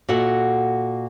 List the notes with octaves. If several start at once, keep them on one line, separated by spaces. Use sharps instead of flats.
A#2 F#4 A4 E5 F#5